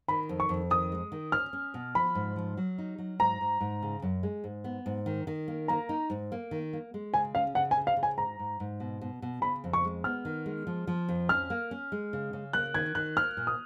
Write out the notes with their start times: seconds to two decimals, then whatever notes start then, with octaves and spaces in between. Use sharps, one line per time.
0.08 D#3 B5
0.29 F2
0.40 C#6
0.49 F2
0.70 D#3 D#6
0.92 G#3
1.12 D#3
1.32 C#4 F6
1.53 C#4
1.74 B2
1.95 F3 B5
2.15 G#2
2.36 F3
2.57 F#3
2.78 D#4
2.98 F#3
3.19 G#2 A#5
3.41 G#2
3.61 G#2
3.82 C#3
4.02 F#2
4.23 G#3
4.44 G#2
4.64 B3
4.86 G#2
5.06 D#3
5.27 D#3
5.48 A#3
5.68 A#3 A#5
5.89 D#4
6.10 G#2
6.32 A#3
6.51 D#3
6.73 A#3
6.94 G#3
7.14 C#3 G#5
7.35 C#4 F5
7.55 C#3 F#5
7.71 G#5
7.76 C#3
7.87 F5
7.97 C#3
8.03 G#5
8.17 G#2 A#5
8.39 G#2
8.60 G#2
8.80 B2
9.01 B2
9.22 B2
9.42 C#3 B5
9.64 F2
9.73 C#6
9.85 G#3
10.04 B3 F6
10.25 D#3
10.46 G#3
10.67 F3
10.87 F3
11.09 F2
11.29 C#4 F6
11.50 A#3
11.71 C#4
11.92 G#3
12.13 C#3
12.33 C#3
12.53 A#3 F#6
12.74 D#3 G#6
12.95 D#3 F#6
13.16 A#3 F6
13.37 A#2
13.47 D#6